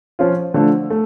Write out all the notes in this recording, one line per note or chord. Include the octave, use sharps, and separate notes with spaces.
F3 C#4 F4
D3 F3 A3
A3